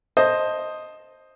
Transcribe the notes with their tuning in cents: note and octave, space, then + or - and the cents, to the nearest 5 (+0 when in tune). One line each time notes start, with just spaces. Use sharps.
C5 +10 D#5 +0 A5 +0